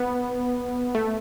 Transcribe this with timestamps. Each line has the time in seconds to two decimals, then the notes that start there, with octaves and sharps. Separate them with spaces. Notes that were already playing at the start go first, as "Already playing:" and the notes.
Already playing: B3
0.95 A3